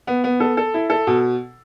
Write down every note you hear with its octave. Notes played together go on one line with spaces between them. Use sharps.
B3
B3
A4
A4
E4
A4
B2